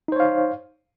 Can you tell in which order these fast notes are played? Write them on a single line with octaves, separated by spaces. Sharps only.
D#4 C5 C#5 F5